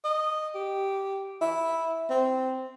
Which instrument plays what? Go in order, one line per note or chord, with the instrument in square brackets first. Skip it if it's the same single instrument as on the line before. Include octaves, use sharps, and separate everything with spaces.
[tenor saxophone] D#5
G4
E4
C4